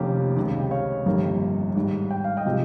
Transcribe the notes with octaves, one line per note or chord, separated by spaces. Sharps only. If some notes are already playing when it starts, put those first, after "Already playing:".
Already playing: F1 F2 D#3 A#3 C#4 G4
C#2 C3 D#3
G5
C#5 F5
G1 F2 D#3 G3 A#3
G#2 D#3 G3
G5
F5
D#5 G5
C3 F3 G#3